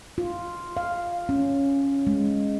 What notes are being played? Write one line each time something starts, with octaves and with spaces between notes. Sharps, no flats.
F4
F5
C#4
G#3